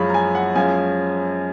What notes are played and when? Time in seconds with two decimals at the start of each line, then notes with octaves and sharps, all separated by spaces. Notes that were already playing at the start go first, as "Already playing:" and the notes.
Already playing: F#2 F3 G#3 C#4 B5 C#6
0.09 A#5
0.14 G#5
0.35 F#5
0.55 F#2 F3 G#3 C#4 G#5